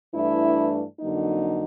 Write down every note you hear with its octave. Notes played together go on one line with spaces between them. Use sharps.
G2 E3 A3 D4 E4
F2 D3 F#3 A#3 D#4